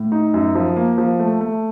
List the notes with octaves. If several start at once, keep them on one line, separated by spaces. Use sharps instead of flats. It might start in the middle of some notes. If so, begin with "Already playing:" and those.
Already playing: A2
D#4
F#2
F3
A#3
F3
A3
A3